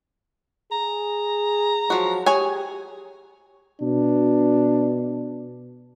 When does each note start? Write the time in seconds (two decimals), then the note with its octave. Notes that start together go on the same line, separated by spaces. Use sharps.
0.72 G#4 A#5
1.90 F3 F#3 F#4
2.26 G4 G#4 C#5 G#5
3.81 B2 D4